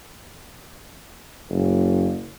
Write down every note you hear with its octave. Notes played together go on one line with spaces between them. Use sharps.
F#1